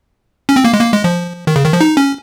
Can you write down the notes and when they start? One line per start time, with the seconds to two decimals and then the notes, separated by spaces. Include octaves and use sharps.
0.49 C#4
0.56 C4
0.64 A#3
0.73 G#3
0.81 A#3
0.93 G#3
1.04 F3
1.47 D#3
1.56 C#3
1.65 D#3
1.73 F3
1.81 D#4
1.97 C#4